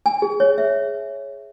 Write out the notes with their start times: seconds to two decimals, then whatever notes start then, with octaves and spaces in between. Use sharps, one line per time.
0.06 G#5
0.22 G#4
0.40 C#5
0.58 E5